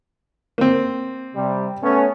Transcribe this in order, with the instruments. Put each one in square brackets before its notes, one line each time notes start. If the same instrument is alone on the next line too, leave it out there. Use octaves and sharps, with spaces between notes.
[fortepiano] A#3 C4
[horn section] C3 G3
A3 B3 C#4